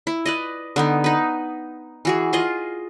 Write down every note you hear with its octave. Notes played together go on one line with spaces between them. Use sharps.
E4
B4 D5 D#5
D3 B3 D#4
D#4 B4
E3 F#4 G#4
F4 G#4 D#5